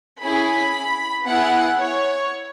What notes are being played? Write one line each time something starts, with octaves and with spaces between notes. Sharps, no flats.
C#4 E4 G#4 B5
B3 E4 G#4 F#5
C#5